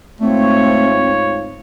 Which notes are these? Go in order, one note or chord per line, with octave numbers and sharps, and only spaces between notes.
G#2 A3 C4 F4 C#5